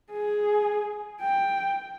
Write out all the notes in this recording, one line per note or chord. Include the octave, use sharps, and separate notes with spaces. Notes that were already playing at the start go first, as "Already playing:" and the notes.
G#4
G5